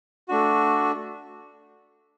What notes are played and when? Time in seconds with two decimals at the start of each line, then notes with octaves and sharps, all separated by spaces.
0.29 A3 D4 F#4